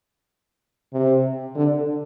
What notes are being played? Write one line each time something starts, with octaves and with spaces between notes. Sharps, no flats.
C3
D3